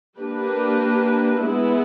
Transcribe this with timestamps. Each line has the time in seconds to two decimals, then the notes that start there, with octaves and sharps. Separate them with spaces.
0.18 A#3 D4 G4 B4
1.44 G#3 B3 E4 G#4